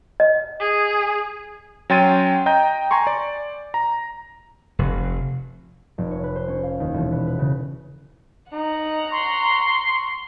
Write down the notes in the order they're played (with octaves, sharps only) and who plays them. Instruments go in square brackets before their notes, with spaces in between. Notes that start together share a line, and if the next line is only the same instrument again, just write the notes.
[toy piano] D#5
[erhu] G#4
[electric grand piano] F#3 C#4 G5 C6 A6 D#7
D#5 G5 A#5 G6
G#5 A#5 C6 C#6
D5
A#5
[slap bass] F1
[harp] F1
C#5
B4
C5
C#4
F5
D#2
E1
B3
B4
C#3
[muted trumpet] D#4 [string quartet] F#5 A#5
[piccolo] C6 [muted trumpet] C#6